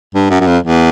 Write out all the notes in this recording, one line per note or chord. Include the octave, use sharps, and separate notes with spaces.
G2
F#2
F#2
F2
E2